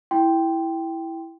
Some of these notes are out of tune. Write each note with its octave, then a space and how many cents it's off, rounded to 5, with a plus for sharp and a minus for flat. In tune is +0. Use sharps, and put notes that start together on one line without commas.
E4 +0 G5 +0 C6 +0